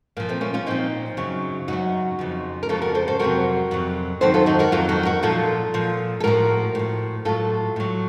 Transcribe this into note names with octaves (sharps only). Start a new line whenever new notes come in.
A#2 F3 A#3
A3 C4
A#3 C#4
C#4 F4
A#2 F3 C4 D#4
F#2 C#3 F#3
F#2 C#3 F#3 D#4 F#4
F2 C#3 F3
A#4
F2 C#3 F3 F4 A4
F#4 A#4
A4 C5
A4 C5
F2 C3 F#3 F#4 A#4
F2 C3 F#3
F2 D#3 F#3 A4 C5
F4 A4
D#4 F#4
F#4 A#4
F2 D#3 F#3 F4 A4
D#4 F#4
F#4 A#4
A#2 F3 F4 A4
A#2 F3
A4
A2 F3 F#4 A#4
A2 F3
A2 F#3 F4 A4
A2 F#3